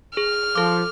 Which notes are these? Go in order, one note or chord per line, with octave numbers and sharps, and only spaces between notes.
G#4 F6
F3 A4 D6